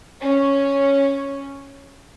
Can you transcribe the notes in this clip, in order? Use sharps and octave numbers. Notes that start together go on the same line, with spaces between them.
C#4